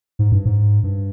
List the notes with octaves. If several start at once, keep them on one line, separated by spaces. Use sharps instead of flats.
G#2
G2
G#2
G2